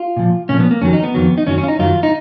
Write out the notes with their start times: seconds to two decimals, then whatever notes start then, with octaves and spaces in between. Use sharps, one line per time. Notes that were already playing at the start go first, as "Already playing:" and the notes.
Already playing: F4
0.17 A#2 F3
0.49 A#2 F3 C#4
0.60 B3
0.71 A#3
0.82 F2 D#3 F#3 C#4
0.93 D#4
1.04 B3
1.14 F2 D#3 F#3
1.38 D#4
1.47 F#2 D#3 F#3 C#4
1.58 C#4
1.63 F4
1.68 D#4
1.79 F#2 D#3 F#3 F4
2.03 D#4